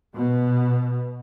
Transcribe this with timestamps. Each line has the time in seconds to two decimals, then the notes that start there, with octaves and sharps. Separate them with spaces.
0.15 B2